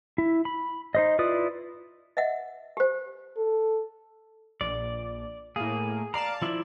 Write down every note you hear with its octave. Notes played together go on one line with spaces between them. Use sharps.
E4
B5
D#4 C5 D#5
E4 F4 B4 D5 D#6
D#5 E5 F#5
G4 C5
A4
A#1 D5
A2 A#3 G#4
D5 F5 A5 A#5
F3 E4 D5